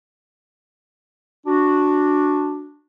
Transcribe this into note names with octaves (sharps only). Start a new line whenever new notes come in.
D4 F#4